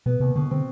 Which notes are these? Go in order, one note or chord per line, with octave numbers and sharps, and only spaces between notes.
B2 B3
D#2 C3
B2 D3
D3 C4